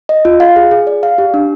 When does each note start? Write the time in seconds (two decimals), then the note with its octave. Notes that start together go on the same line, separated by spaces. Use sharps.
0.09 D#5
0.25 F4
0.40 F5
0.56 G#4
0.71 G#4
0.87 D5
1.03 F5
1.18 G4
1.34 D4